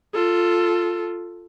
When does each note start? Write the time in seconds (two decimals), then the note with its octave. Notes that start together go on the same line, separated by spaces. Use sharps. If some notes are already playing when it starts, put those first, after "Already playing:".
0.14 F4 A4